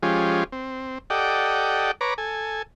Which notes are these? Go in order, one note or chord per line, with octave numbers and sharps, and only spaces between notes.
F3 G#3 C#4 F4 G4
C4
G4 A4 D5 D#5 F#5 G5
B4 C#5 A#5 D6
A4 G#5